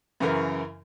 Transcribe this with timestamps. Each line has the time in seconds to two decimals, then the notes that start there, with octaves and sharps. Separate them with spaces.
0.20 F#2 C#3 E3 A#4